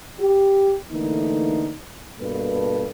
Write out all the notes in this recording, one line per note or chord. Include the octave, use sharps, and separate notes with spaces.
G4
D3 E3 A3 A#3 D#4
G2 B2 A#3 A4 B4